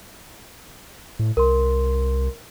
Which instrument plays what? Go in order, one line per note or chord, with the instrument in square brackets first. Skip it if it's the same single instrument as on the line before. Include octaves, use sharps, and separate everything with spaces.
[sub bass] A2
[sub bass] C2 [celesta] A#4 C6